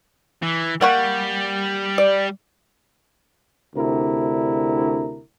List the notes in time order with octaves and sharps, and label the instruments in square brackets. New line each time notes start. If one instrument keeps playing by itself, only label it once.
[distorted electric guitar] E3
[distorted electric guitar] G3 [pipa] A#3 F#5 C#6
[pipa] D5
[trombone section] D2 C3 D4 E4 A#4